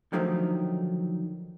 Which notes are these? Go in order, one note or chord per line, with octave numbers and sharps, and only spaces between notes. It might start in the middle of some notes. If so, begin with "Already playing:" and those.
D3 D#3 F3 F#3 A3 D#4